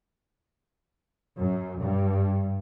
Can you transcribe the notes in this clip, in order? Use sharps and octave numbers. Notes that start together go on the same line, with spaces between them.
F#2
G2